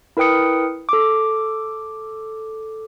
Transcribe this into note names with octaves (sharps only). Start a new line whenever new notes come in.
E4 A#4 B4 G5 D#6 C#7
A4 D6